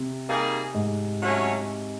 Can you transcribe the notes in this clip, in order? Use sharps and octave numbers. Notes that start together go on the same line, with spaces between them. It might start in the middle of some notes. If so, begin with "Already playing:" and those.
Already playing: C3
G3 A#3 D#4 G#4
G#2
F#3 A3 C#4